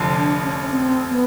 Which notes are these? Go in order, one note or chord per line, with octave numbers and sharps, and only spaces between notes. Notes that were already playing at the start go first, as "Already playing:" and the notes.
Already playing: F1 F2 D3
D4
C#4
C#4
C4
B3